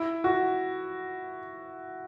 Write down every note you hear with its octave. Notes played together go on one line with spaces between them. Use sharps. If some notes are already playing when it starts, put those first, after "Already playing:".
Already playing: E4
F#4